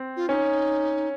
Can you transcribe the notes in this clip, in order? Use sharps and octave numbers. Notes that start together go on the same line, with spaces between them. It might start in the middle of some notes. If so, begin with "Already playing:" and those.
Already playing: C4
F4
C#4 D#4